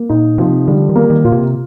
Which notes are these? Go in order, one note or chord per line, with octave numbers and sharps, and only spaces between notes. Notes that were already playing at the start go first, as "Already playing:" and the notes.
Already playing: A#3
A#2 D#4
C3 F3
D3 G3
D#3
A#3
D#3
A#2 F4
C3